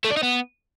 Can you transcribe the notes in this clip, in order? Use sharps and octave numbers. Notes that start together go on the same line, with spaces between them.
A3
D4
D#4
B3